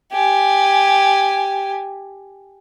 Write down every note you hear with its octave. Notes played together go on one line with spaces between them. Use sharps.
G4 G#5